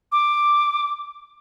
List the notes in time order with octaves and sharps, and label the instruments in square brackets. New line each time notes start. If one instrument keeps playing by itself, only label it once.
[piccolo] D6